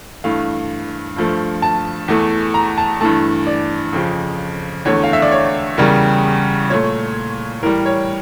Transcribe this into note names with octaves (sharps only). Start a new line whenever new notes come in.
G2 E3 A3 F5
G2 F3 A3
A5
E2 E3 A3
A#5
A5
G2 E3 A3 A5
D5
F2 C#3 F3
E2 D3 A3 C#5
F5
E5
D5
C#5
E2 C#3 G3 A#4
A#2 A3 C#5
A2 E3 G3 A#4
C#5